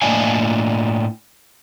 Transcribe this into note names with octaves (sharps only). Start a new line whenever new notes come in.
A2 A#3 D4 D#5 F5 G#5